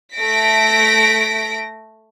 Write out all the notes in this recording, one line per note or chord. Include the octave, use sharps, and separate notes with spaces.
A3 A#6 B6 D7